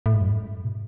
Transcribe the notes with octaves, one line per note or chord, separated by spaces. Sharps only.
A2
G#2
F#2
G#2
B2